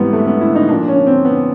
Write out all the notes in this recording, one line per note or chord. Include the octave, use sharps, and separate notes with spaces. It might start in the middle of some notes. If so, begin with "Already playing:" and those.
Already playing: G#2 E3 G3 B3 C4
A3
B3
E4
D#4
A#2 F3 D4
C#4
C4
B3